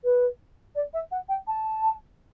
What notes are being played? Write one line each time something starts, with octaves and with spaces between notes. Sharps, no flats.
B4
D5
E5
F#5
G5
A5